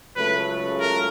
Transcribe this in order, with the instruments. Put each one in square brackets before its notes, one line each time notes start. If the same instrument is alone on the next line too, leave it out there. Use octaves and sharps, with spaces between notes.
[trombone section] C#2 C#3 F#3 A3 [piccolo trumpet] B4
[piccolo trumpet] A#4